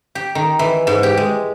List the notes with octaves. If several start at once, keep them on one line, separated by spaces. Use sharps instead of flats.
G4
D#3
E3
G#2
G4
G#3